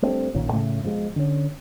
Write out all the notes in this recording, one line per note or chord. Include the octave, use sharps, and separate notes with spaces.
G3 A3 C4 D4
A#1 A#2 D#3 C#4
A2 C#3 A3
B2 F3 F#3 G#3
D3 C#4